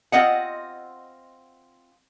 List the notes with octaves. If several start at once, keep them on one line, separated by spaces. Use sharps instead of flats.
C4 F4 D#5 E5 F#5